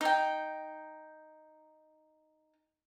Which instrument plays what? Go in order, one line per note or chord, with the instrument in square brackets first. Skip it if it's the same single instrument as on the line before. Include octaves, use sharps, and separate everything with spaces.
[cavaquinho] D#4 G5